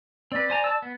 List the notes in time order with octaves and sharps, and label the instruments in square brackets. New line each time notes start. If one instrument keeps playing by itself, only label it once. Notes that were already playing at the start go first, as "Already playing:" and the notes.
[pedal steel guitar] C4 B4 [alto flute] D5
[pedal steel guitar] C5 G#5 A#5
A5 E6
B3